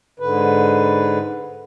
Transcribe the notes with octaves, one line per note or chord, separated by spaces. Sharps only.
G#2 D3 B4